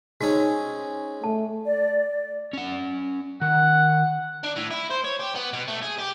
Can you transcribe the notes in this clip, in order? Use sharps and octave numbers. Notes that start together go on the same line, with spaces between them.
G#3 C4 C#4 D#4 F#4
A3 A5
D5
C#4 F#5
D#3 F#5
D4
A2
E4
C5
C#5
G4
B3
B2
A3
G#4
G4